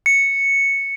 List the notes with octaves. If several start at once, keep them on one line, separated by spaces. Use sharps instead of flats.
C#7